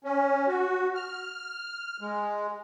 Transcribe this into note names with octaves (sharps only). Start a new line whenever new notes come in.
C#4
F#4
F6
G#3